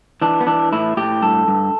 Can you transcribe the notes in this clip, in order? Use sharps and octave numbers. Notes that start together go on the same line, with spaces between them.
E3 D4
B3
E3 D4
A2 E4
A2 G4
G2 A4
G2